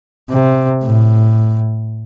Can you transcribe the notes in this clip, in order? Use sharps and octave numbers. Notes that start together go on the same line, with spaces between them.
C3
A2